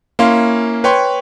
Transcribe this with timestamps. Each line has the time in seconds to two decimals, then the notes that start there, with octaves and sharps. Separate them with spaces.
0.19 A#3 C#4 E4 F5 C6
0.84 B4 C#5 G5 C6 C#6